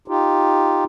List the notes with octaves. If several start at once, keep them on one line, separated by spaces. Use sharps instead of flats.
D#4 F4 G4